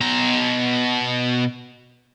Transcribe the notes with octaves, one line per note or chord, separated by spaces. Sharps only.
B2 A#5